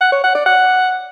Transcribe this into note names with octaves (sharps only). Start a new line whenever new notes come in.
F#5
C#5
F#5
D5
F#5